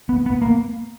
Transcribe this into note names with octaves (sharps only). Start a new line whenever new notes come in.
B3
B3
A#3